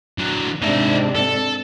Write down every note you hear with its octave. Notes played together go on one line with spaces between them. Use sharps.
D3 F#3
G#2 C3 D4 D#4 E5
A4